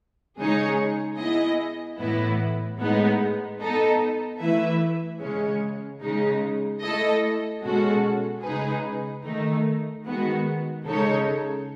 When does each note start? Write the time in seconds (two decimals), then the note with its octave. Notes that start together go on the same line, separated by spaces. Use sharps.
0.38 C#3 G#3 D#4 G#4 C#5
1.18 B3 E4 G#4 D#5
1.99 A2 E3 B3 E4 B4
2.79 A2 G#3 B3 D#4
3.60 B3 D#4 A4
4.40 E3 A3 E4 B4 E5
5.21 C#3 G#3 C#4
6.02 C#3 G#3 D#4
6.82 A3 E4 A4 D#5
7.63 B2 G#3 C#4 F#4 A4
8.43 C#3 G#3 D#4 G#4 B4
9.23 D#3 A3 D#4
10.05 D#3 G#3 B3 F#4
10.86 C#3 G#3 D#4 A4 C#5